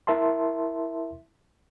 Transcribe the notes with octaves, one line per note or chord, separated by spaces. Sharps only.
E4 A#4 E5 A5 C6